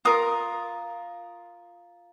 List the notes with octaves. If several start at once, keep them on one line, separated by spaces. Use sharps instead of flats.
F4 A#4 D#6